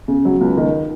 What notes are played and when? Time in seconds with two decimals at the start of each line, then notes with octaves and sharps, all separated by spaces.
0.08 C#3
0.25 F#3
0.41 C#2
0.57 D#3